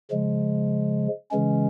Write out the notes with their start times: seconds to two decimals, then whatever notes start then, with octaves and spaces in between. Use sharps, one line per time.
0.10 C#3 F3 G#3
1.31 C#3 E3 G#3 C#4